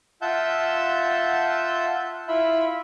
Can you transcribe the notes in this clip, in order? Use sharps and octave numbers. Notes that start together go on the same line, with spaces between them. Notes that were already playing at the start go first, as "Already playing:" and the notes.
F4 E5 F#5 A5 E6 G6
E4 F4 E5 B5